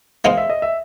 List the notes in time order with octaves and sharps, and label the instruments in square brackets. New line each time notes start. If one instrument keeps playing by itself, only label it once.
[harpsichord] G#3 B3 D#4 G#4 C5 [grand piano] F5
[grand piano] E5
D#5
E5